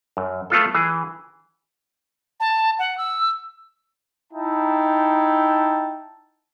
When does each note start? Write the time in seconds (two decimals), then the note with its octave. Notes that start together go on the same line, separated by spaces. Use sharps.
0.17 F#2
0.50 A3 B3 F4 A4
0.75 E3 G#4
2.40 A5
2.79 F#5
2.98 E6
4.33 D#4 E4 G5 A5